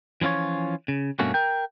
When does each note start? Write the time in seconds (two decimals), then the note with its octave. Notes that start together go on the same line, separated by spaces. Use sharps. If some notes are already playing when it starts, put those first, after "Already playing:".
0.21 E3 F3 C#4 F4 C#5
0.88 C#3
1.19 G2 B2 A3 A#3 C#4 F#4
1.34 A#4 G5